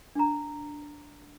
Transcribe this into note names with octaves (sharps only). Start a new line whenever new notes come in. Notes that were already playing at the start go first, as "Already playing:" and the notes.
D4 A#5